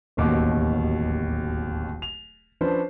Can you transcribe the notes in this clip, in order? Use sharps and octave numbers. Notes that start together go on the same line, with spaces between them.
D1 A1 D#2 B2 D6
F7
F3 C#4 D4 B4 C5